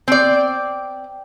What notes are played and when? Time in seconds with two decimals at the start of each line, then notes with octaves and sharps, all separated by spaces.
0.08 C4 D5